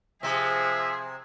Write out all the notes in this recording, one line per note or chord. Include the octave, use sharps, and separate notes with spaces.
C3 F3 C4 G#4 E5